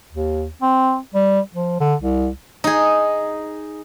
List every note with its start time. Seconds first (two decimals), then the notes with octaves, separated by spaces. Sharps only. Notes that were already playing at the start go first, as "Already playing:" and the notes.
0.12 D#2
0.62 C4
1.14 G3
1.55 F3
1.80 D3
2.01 C2
2.64 D#4 G#4